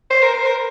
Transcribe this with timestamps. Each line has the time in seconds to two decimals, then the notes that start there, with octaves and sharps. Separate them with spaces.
0.10 C5
0.22 A#4
0.34 C5
0.46 A#4